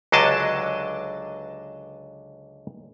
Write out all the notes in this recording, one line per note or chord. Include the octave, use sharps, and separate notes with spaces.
C#2 D3 F#3 D4 D#5 A5